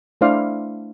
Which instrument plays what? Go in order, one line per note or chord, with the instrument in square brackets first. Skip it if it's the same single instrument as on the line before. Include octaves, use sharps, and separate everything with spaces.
[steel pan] A3 D4 E4 C5 D5 F5